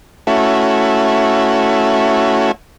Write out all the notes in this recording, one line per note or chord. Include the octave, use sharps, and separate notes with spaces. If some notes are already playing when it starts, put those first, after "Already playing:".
A3 C#4 E4 F#4